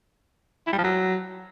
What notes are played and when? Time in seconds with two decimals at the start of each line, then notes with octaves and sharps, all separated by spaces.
0.67 E4
0.72 G3
0.78 F3
0.84 F#3